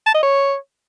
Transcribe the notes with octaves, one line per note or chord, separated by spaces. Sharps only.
A5
D#5
C#5